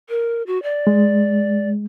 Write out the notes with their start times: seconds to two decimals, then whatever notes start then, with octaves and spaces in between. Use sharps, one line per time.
0.09 A#4
0.47 F#4
0.63 D5
0.87 G#3